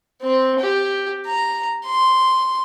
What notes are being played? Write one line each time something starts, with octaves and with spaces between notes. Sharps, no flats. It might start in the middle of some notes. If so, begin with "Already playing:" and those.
C4
G4
A#5
C6